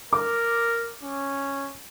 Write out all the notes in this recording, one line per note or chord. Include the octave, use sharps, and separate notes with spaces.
A#4 D6
C#4